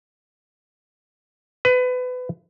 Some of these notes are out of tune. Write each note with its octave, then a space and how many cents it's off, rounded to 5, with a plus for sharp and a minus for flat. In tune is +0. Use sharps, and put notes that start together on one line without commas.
B4 +25